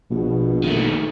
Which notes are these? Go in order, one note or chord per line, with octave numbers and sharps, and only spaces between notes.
A#1 B2
D#3 A3